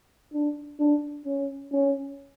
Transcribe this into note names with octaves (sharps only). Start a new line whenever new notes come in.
D4
D4
C#4
C#4